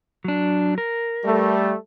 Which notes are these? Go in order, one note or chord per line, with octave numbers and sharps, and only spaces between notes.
F#3 D4
A#4
G3 A3